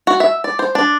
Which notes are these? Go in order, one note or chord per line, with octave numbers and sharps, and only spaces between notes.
F#4
E5
D5
C5
D4